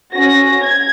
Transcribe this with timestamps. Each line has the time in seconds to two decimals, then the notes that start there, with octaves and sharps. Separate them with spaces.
0.12 C#4 F#4 A#6
0.62 G#6